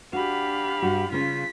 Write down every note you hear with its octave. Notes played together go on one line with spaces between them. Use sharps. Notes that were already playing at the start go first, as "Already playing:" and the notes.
D4 F#4 G4 F5 B5
G2 F#4
C#3 C#4 F4 B6